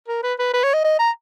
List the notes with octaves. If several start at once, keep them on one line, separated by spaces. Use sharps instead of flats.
A#4
B4
B4
B4
C#5
D#5
D#5
A#5